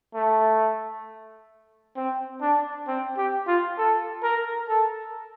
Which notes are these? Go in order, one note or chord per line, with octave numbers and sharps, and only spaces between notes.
A3
C4
D4
C4
G4
F4
A4
A#4
A4